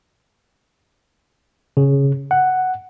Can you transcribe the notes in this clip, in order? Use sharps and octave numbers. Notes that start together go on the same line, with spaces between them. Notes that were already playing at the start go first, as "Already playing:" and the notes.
C#3
F#5